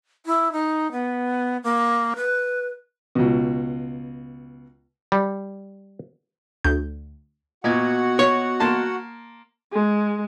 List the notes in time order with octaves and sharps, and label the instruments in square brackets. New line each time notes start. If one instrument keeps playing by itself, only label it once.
[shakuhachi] E4
D#4
B3
A#3
B4
[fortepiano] C#2 B2
[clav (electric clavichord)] G3
[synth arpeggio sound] D2 G6
[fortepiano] A#2 [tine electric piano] B3 D#5 G#6 [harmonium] F#4 F#5
[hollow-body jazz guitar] C#5
[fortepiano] A#3 A5 C6
[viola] G#3